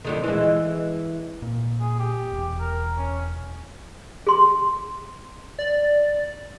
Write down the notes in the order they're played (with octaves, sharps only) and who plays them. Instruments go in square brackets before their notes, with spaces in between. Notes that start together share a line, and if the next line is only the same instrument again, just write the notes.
[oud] F2 D3 D#3
E3 G#3
[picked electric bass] A#2
[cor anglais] G#4
G4
[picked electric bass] E1
[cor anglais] A#4
C#4
[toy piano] G#4 C6
[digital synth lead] D5